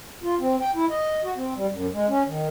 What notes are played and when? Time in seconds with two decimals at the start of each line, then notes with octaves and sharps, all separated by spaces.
0.23 F4
0.40 C4
0.61 G5
0.75 E4
0.90 D#5
1.24 F#4
1.36 C4
1.56 G3
1.71 F#2
1.93 G#3
2.08 C#4
2.27 D#3